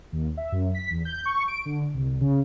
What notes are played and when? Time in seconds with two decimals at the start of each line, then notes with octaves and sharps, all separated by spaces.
0.12 D#2
0.37 E5
0.52 F#2
0.75 B6
0.91 E2
1.05 G6
1.25 C#6
1.48 D7
1.66 D3
1.94 C2
2.21 C#3